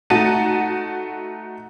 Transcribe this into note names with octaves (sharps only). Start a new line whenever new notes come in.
A3 D#4 F#4 F#5 A5 D#7